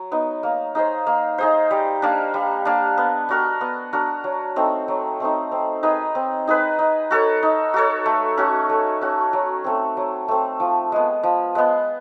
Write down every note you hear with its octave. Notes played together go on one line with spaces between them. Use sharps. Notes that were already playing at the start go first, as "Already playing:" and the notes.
Already playing: F#3
B3 D#4
A#3
D#4 G#4 C5
A#3
D#4 G#4 C5
G3
A#3 D4
G3
A#3 D4
B3
D4 F#4 A#4
B3
D4 F#4 A#4
F#3
A3 C4 D#4
F#3
A3 C4 D#4
C4
D#4 G#4 B4
C4
D#4 G#4 B4
D#4
F#4 A4 C#5
D#4
F#4 A4 C#5
A3
C#4 F#4
A3
C#4 F#4
F#3
A3 C4
F#3
A3 C4
F3
G#3 B3
F3
G#3 B3